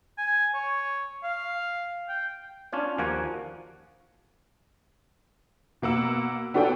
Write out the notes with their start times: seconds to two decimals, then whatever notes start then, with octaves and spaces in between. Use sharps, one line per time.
0.18 G#5
0.55 C#5
1.24 F5
2.09 G5
2.72 C#4 D4 F4 C#5
2.98 D#2 F3 A#3 F#4 F#5 G#5
5.82 B2 A#3 F#5 E6
6.54 B3 D4 F#4 A4 C#5 G5